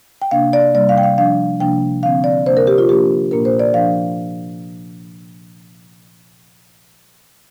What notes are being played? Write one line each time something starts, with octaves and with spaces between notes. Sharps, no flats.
G5
C3 A#3 D4 F5
D5
C3 G3 A#3 D5
F5
G5
F5
F3 D4 F5
C3 F3 A#3 D4 G5
D3 F3 C4 F5
D5
C3 A#3 D4 C5
A#4
G4
F4
F3 A#3 D4 G4
A#2 A#3 D4 A#4
C5
D5
F3 D4 F5